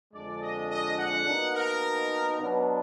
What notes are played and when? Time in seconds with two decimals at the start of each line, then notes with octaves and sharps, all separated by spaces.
0.14 F2 D3 G#3 D4 D5
0.42 D#5
0.70 D#5
0.98 F#5
1.27 B2 A#3 D#4
1.55 A#4
2.40 B2 F#3 B3 D4